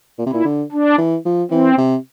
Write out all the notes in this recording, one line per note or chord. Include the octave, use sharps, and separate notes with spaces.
A#2
C3
A#2 E4
D3
D4
E3
F3
E3 C4
C3